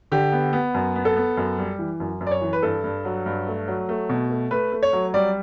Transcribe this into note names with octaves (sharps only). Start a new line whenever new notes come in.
D3 G4
B3
B3
F#2
B3
A4
B3
F#2
G3
E3
F#2
F#2
D5
C#5
E3
B4
G2 A4
G2
F#3
G2
A3
F#3
A3
B2
A3
A3 B4
A3
C#5
F#3
G3 D5